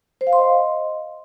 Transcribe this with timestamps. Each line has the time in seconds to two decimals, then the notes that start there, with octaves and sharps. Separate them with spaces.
0.21 C5
0.27 F5
0.33 C6
0.39 D#5